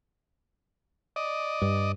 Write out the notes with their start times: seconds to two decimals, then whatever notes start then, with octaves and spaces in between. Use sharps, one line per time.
1.16 D5 D#5
1.62 G2